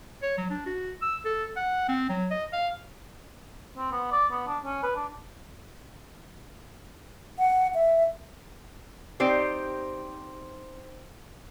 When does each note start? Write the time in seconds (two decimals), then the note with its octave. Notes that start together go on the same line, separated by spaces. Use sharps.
0.23 C#5
0.38 F#3
0.50 D4
0.66 F#4
1.02 E6
1.25 A4
1.57 F#5
1.89 C4
2.09 F#3
2.31 D#5
2.53 F5
3.77 C4
3.91 B3
4.12 D5
4.32 B3
4.47 D4
4.64 C#4
4.83 B4
4.95 D4
7.39 F#5
7.74 E5
9.20 C4 D#4 G4 C5 D5